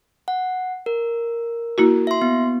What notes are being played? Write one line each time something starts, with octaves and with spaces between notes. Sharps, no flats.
F#5
A#4
A#3 E4 F#4
E5 C6
B3